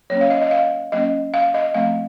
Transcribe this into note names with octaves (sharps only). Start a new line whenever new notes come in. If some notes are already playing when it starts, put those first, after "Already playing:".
F#3 A#3 C#4 C#5
F5
D#5
D#5
F5
F#3 A#3 C#4 D#5
F5
D#5
F3 A3 C4 F5